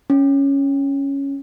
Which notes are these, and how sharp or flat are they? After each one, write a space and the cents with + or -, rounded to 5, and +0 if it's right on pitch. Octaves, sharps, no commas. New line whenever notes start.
C#4 +0